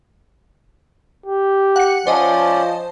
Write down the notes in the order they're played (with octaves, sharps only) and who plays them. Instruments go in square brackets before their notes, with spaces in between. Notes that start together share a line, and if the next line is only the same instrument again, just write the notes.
[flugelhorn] G4
[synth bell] F#5 C#7
[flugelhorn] F3 [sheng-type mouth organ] C#4 D5 [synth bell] C5 D#5 A5